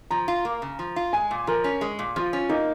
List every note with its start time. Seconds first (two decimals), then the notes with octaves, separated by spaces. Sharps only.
0.11 F3 A#5
0.28 F4
0.45 A#3
0.62 C#3
0.79 F3
0.96 F4
1.13 G#3 G#5
1.31 A#2
1.47 F3 A#4
1.64 C#4
1.81 G#3
1.99 A#2
2.16 F3 F4
2.33 C#4
2.49 A#3 D#4